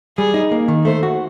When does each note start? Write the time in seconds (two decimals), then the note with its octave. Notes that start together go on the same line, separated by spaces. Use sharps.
0.17 G3 G#4
0.34 D#4
0.51 A#3
0.68 D#3
0.85 A3 C5
1.03 F#4